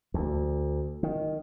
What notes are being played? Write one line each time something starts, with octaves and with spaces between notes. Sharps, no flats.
D2
D#3